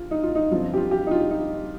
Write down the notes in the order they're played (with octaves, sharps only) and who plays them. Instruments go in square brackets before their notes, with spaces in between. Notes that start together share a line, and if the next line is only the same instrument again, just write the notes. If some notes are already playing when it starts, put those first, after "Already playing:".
Already playing: [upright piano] F4
D#4
F4
D#4
G1 G2 F3 C4 F4
G4
F4
G4
D#4
F4
D#4